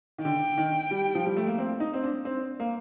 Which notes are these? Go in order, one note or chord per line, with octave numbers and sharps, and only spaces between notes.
D#3
D3 G5
D#3
G3
F3
G3
A3
A#3
C4
D#4
C4
D4
C4
A#3